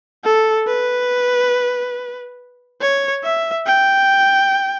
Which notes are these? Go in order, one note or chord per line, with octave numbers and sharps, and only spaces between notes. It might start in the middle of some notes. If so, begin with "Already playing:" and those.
A4
B4
C#5
E5
G5